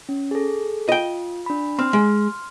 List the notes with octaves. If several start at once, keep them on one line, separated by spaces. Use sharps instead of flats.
C#4
G#4 A4
F4 D#5 G5
D4 B5
C4 C6 F6
G#3